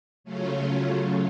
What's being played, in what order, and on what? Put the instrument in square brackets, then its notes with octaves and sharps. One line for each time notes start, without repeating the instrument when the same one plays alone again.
[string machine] C#3 F#3 A3 C#4 F4